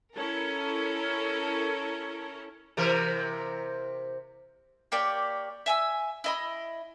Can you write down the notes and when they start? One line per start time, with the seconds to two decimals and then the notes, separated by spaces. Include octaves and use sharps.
0.16 C#4 E4 A4 A#4
2.77 C3 E3 A#4
4.92 A#3 G4 C#5 D5
5.66 E5 G#5 E6
6.24 E4 D#5 B5